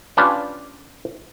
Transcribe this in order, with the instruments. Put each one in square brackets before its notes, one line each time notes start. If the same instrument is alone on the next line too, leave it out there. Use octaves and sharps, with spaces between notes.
[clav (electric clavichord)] C#4 D4 F4 G4 B4